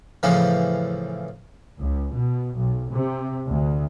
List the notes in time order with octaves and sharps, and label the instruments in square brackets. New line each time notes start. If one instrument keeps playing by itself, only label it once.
[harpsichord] A2 C#3 E3 F3
[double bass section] C#2
B2
B1
C3
D2